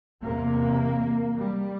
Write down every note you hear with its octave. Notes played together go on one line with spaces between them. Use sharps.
E2 C3 A#3
G3